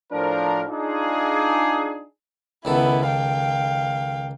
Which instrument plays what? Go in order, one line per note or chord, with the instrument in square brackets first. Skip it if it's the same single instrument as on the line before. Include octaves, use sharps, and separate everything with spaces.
[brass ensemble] A2 F3 D4 A#4
D4 D#4 F4 G#4
[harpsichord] C#2 D#3 A4 [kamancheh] B3 E4
[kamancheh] F5 G5